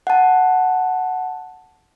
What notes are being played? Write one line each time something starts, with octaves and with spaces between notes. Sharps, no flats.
F#5 A5